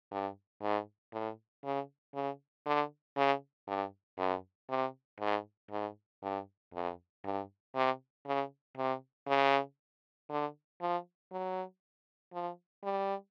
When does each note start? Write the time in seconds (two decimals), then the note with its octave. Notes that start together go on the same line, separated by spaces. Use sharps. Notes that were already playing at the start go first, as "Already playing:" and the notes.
0.12 G2
0.62 G#2
1.13 A2
1.64 C#3
2.15 C#3
2.66 D3
3.17 C#3
3.68 G2
4.18 F#2
4.70 C3
5.20 G#2
5.71 G#2
6.23 G2
6.74 F2
7.25 G2
7.75 C3
8.26 C#3
8.77 C3
9.28 C#3
10.30 D3
10.81 F3
11.32 F#3
12.34 F3
12.84 G3